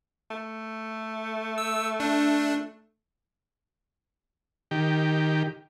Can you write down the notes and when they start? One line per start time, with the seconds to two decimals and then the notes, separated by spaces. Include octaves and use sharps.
0.31 A3
1.58 E6
2.00 D4
4.71 D#3 G4